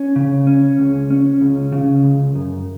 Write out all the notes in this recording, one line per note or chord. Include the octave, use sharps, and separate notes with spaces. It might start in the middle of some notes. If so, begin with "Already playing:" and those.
Already playing: C#4
C#3
C#4
C#2
C#4
C#2
C#3
C#2
F#2